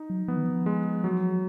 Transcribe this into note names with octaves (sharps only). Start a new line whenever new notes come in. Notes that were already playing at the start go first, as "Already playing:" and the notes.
Already playing: D#4
F#3
F3 B3
D#3
F3
G#3
F#3